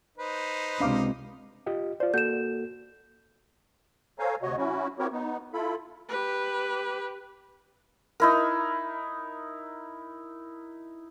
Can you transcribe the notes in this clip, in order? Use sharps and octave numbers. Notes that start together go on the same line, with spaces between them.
D#4 B4 C5
C#2 C3 D4 F5 D6 C7
F4 G4 D#5
F4 C5 D5
A#3 F#4 A4 G6 E7
A4 C5 C#5 F5 G#5 A#5
D2 C3 F#4 C#5 D#5
F#3 C#4 E4 F#4
C4 E4 F#4 G4 A#4 C#5
B3 D#4
E4 F4 A4 B5
G4 B4
D#4 E4 A#4